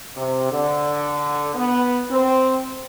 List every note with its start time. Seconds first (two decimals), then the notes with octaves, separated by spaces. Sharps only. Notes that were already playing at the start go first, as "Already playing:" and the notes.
0.16 C3
0.51 D3
1.55 B3
2.10 C4